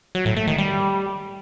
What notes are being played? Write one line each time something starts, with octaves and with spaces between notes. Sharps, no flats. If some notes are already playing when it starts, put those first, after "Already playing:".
F#3
A2
A3
D#3
G3